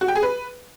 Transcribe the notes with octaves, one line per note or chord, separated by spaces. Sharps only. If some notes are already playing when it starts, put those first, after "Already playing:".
F#4
G5
G#4
B4